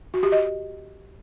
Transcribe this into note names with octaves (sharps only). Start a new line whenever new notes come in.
F#4
G4
D#5